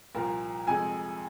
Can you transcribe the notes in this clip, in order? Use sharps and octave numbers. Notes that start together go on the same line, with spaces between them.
C2 A#2 F3 A#4
F2 C3 G#3 G#5